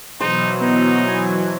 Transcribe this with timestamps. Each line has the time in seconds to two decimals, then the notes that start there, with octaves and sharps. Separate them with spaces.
0.20 B2 E3 F#3 D#4 C5
0.61 B3 D#4
1.08 G#5